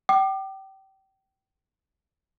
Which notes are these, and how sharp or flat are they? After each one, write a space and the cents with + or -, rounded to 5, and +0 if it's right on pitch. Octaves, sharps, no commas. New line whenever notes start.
G5 -30 D6 +35